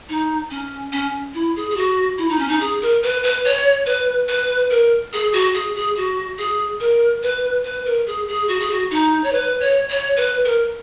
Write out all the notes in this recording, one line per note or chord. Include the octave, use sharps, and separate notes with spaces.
D#4
C#4
C#4
E4
G#4
G#4
F#4
E4
D#4
C#4
D#4
G#4
A#4
B4
B4
C#5
B4
B4
A#4
G#4
F#4
G#4
G#4
F#4
G#4
A#4
B4
B4
A#4
G#4
G#4
F#4
G#4
F#4
D#4
C#5
B4
C#5
C#5
B4
A#4